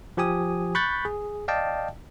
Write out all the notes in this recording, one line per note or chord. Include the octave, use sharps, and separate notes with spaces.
F3 G4 G#5 D#6
B5 C#6 F#6 G6 A6 B6
G#4
D5 D#5 F5 G5 A5